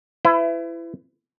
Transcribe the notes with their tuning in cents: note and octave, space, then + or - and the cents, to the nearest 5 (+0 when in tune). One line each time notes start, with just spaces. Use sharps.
E4 +25 B4 +40